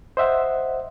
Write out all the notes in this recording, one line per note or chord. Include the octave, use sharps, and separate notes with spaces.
C5 D#5 E5 F#5